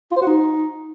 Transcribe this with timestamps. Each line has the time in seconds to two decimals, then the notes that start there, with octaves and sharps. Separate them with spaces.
0.11 F4
0.16 C5
0.22 F#4
0.27 D#4